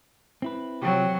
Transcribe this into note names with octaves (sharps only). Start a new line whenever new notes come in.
C4 E4 B4
C3 F3 F#3 C4 G4